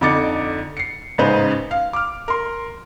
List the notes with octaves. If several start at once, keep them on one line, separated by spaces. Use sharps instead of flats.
F2 D3 D#4 D6 A6 C#7
C7 C#7
A1 G#2 C#3 D#4 B4 C5
F5
D6 F6
A#4 C6